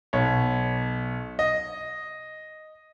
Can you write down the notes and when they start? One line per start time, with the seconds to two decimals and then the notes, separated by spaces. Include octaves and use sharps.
0.13 B1 C#5
1.39 D#5